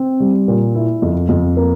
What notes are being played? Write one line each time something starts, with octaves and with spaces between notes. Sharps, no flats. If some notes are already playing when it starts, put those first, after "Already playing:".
Already playing: C4
G3
A#2
E4
F2
F2
A#3